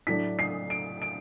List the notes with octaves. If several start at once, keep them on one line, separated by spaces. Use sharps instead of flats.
A2 F#3 A3 D4 B6
C7
D7
D7